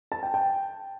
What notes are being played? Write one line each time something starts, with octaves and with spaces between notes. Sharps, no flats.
A5
G5
G5